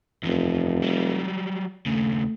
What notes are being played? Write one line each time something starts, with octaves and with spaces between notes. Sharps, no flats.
F1 E2 F3
F#3 G3
D#2 C#3 A3